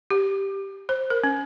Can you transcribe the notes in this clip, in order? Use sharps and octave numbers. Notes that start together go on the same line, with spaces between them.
G4
C5
A#4
C#4